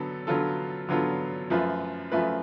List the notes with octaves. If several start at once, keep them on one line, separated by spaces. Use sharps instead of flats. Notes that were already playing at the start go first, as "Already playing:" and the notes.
Already playing: D3 F#3 B3 A4
D3 F#3 B3 F4 A4
D3 F#3 B3 F4 A4
F#2 F3 A3 F4 B4
F#2 F3 A3 F4 B4